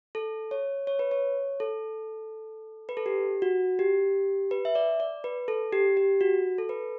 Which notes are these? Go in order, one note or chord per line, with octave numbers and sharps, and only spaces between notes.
A4
C#5
C#5
B4
C#5
A4
B4
A4
G4
F#4
G4
B4
E5
D5
D5
B4
A4
G4
G4
F#4
A4
B4